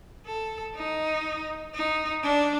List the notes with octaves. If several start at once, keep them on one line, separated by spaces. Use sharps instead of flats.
A4
D#4
D#4
D4